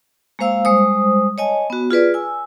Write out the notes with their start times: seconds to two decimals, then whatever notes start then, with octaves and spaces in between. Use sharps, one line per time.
0.39 G#3 A#3 C5 F5 E6
0.65 G3 G#3 C5 D#6
1.38 C#5 D#5 G#5 A5
1.70 B3 F#4
1.91 F4 G#4 B4 D5
2.14 G#5 E6